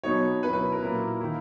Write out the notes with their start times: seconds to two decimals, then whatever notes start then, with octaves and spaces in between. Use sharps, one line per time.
0.04 B2 F#3 B3 D#4 C#5
0.43 B2 F#3 C#4 E4 B4
0.53 B4
0.72 A#4
0.82 A#2 F#3 A#3 E4
1.21 D#3 A#3 E4